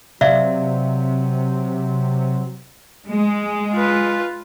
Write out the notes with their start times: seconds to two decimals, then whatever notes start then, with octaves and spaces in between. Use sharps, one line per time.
0.21 C3 F#3 D5 E5 F5
3.09 G#3
3.74 F4 B4